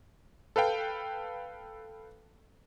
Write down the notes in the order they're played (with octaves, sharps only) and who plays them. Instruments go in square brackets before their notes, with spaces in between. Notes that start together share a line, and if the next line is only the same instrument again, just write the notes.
[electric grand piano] A4 B4 F5 G5